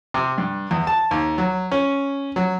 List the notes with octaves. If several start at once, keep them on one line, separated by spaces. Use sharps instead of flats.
C3
G2
E2
A5
D#2
F#3
C#4
F#3